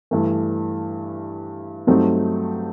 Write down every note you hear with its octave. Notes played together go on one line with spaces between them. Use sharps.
G2 E3 A3
G2 F#3 A3 C4 D#4